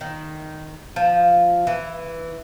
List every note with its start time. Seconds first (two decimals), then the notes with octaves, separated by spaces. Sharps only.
0.01 D#3
0.96 F3
1.67 E3